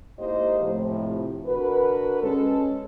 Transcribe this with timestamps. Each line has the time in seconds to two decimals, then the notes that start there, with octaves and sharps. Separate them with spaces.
0.19 G#2 A#3 E4 G4 C5 D#5
0.60 A2 C3 F3
1.46 D3 F#4 A#4 B4
2.22 G#3 C#4 A4